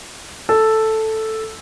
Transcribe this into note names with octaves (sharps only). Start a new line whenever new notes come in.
A4